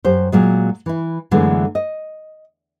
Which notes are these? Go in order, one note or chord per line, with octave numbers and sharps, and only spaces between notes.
F#2 G4 C5
A#2 F#3 G#3
E3 E4
F#2 D3 E3 G#3 A3 B3
D#5